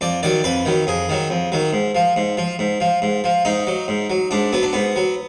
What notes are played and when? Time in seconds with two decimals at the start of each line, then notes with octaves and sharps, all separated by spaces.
0.01 F2 D5
0.23 D#3 F#3 D5
0.44 F2 B4
0.65 D#3 F#3
0.87 F2 G#4
1.09 D#3 F#3
1.30 F2
1.52 D#3 F#3
1.73 G#2
1.95 F3
2.16 G#2
2.37 F3
2.59 G#2
2.80 F3
3.02 G#2
3.24 F3
3.45 G#2 D#4
3.67 F#3
3.88 G#2
4.10 F#3
4.31 G#2 D4
4.53 F#3 B3
4.63 D4
4.73 G#2 B3
4.96 F#3